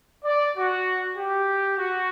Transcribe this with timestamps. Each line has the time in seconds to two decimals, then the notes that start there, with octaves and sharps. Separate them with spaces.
0.24 D5
0.57 F#4
1.16 G4
1.77 F#4